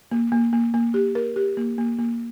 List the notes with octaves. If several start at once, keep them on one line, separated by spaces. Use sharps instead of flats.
A#3
A#3
A#3
A#3
G4
A#4
G4
A#3
A#3
A#3